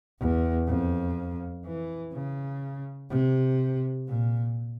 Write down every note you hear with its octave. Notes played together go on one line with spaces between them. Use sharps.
E2
F2
E3
C#3
C3
A#2